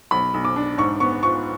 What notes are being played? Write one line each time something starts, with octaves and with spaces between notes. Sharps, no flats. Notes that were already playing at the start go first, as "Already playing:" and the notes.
B1 B5
B1
D6
D4
G#2 C#6
B3 C#6
F4 C#6